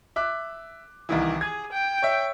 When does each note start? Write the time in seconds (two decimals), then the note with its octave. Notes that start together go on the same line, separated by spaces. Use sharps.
0.16 E5 D6 F#6
1.09 C2 D#3 E3
1.41 G#4 G#6
1.72 G5
2.02 C#5 E5